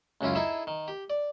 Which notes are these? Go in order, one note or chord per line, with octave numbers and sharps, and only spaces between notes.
C#2 F#2 C#4 E4 F4
D#4 E4 G#4 A4 E5
D#3
G4
D5